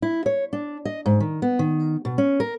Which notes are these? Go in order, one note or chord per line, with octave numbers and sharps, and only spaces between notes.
E4
C#5
D4
D#5
G#2
D#3
B3
D#3
B2
C#4
A#4